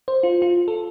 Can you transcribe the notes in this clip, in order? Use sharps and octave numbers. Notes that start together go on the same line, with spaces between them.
C5
F4
F4
A4